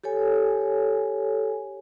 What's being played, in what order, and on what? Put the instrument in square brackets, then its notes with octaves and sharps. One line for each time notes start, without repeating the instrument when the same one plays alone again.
[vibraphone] G4 A4 C#5 G#5